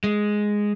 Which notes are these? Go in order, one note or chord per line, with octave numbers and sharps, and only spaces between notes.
G#3